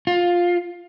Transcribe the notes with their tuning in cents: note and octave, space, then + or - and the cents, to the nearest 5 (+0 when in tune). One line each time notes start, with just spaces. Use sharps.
F4 +10